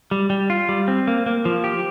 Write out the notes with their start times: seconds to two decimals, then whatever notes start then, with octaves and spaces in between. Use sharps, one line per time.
0.11 G3
0.30 G3
0.50 F4
0.69 G3
0.88 C4
1.07 A#3
1.26 A#3
1.45 F3
1.64 G4